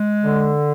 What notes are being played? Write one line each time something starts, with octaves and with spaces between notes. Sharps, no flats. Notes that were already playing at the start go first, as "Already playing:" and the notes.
Already playing: G#3
D3